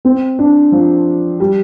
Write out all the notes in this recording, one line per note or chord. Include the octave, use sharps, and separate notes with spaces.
C4
D4
F3
G3